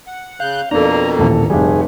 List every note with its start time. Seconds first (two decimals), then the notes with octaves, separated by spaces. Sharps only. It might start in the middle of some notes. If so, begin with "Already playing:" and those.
0.07 F#5
0.40 C#3 F5 F#6 G6
0.71 F2 B2 A#3 D4 A4 A#5
1.19 D#1 A1 A#2 A4
1.50 F1 G3 A3 G#4